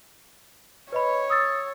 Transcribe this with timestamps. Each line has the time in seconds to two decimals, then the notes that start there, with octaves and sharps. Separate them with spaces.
0.92 B4 C#5 D#5 B5
1.30 D#6 E6 A6